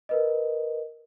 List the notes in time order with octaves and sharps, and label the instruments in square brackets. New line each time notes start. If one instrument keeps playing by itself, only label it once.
[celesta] A#4 B4 D#5